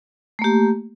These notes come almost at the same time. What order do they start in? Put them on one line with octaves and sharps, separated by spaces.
A3 A#3 G4